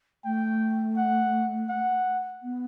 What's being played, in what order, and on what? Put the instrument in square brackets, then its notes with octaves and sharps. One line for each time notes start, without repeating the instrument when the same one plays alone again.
[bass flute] A3 [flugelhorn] G5
[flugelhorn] F#5
F#5
[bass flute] B3